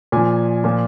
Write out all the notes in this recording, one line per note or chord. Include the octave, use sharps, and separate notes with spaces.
A#2 F3 G#5
A#2 F3